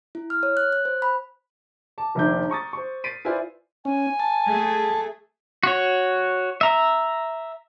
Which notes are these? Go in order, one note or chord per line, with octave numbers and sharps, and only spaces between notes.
E4
F6
C#5
F#6
F#6
C5
B5
A5 D6
F1 A#1 D#3 F3 D4 G6
A#5 C#6 D#6 A6
C5 C#6
A6 B6 C7 D7 D#7
E4 F4 B4 C5 D5 G#5
C#4 G#5
A5
A3 G#4
F#4 C#5
E5 A#5